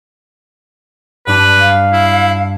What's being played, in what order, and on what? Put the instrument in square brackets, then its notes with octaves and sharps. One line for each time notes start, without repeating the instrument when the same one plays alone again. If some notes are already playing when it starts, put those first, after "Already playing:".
[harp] G2 D4 [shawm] B4
[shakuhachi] F5
[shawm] E4